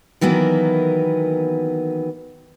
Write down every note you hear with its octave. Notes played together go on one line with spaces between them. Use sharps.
D#3 E3 F#3 A#3 B3